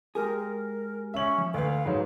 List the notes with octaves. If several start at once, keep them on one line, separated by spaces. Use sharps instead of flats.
G#3 G4 G#4 A#4
A#4
C#4 E5 F#7
F3
D2 B4 D5 F5
G#2 F#3